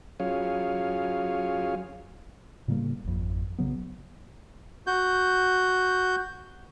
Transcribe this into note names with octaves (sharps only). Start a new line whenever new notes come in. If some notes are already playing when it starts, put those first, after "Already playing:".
F#3 C#4 F4 G#4 C#5 F5
A2 C#3 G3 A#3
G#1 F2
A#1 C#3 F#3 B3
F#4 G6